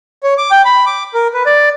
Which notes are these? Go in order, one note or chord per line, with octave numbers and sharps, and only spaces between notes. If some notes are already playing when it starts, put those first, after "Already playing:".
C#5
D6
G5
B5
D6
A#4
B4
D5